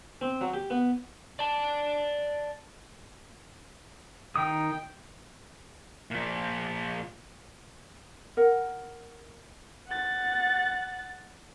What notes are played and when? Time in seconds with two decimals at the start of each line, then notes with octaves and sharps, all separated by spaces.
0.21 C4
0.41 F#3
0.54 G4
0.70 B3
1.39 D5 A5
4.36 D#3 D#4 G5 D#6
6.11 A#2 F3
8.37 A#4 F#5
9.88 F#5 A6